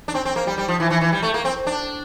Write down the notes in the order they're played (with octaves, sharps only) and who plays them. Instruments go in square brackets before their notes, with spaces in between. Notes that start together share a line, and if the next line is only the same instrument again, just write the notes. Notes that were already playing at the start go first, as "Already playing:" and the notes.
[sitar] D4
C4
C4
A#3
G3
G3
F3
E3
E3
E3
G3
A3
A#3
C4
D4